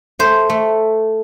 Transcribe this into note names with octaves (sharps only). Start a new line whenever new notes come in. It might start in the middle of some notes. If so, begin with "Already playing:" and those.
A3 C5
A3